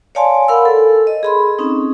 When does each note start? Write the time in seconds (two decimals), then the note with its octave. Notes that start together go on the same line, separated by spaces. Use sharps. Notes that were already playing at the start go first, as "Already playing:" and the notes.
0.15 C#5 D5 F5 G#5 A5 C6
0.48 A#4 F5 F#5 B5 E6
0.65 A4
1.07 D#5
1.23 G#4 B5 C6
1.59 C4 C#4 D#4